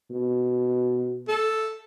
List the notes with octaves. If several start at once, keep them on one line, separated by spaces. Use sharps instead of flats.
B2
A4